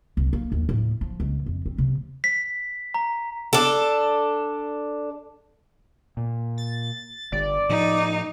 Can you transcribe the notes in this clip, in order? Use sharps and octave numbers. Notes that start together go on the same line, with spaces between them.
C2
A#3
D#2
A2
F3
C#2
F2
C4
C3
B6
A#5
D4 A4
A#2
A6
G1 D5
A2 F3 D#4